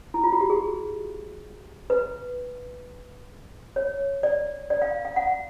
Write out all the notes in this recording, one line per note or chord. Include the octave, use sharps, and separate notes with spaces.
E4
F4
F#4
G4
G#4
B4
C#5
D5
D5
F5
F5
F#5